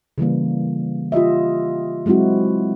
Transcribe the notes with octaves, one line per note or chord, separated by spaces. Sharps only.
C#3 E3 G3 A#3
F4 G4 D#5 E5
F#3 G#3 C4 E4 F#4